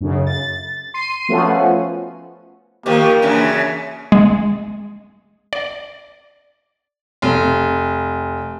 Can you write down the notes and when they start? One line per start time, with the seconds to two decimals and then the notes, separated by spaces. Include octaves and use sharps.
0.01 F#2 C#3
0.27 A6
0.94 C6 C7 D#7
1.29 F3 A3 B3 C#4 F4 F#4
2.86 D#3 F3 A#3 G4
3.22 F#2 C#3 E3 D4
4.12 G#3
5.53 D5
7.22 F1